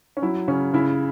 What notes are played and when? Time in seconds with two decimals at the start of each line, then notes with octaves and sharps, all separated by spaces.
0.17 C#4
0.22 F#3 E4
0.48 C#3 C#4
0.74 C#3 E4